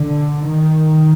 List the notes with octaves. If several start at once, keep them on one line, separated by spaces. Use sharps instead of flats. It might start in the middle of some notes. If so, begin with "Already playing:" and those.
Already playing: D3
D#3